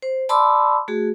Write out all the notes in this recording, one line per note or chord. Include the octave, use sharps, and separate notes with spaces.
C5
D5 A5 B5 C6 D6 E6
A3 F#4 G#4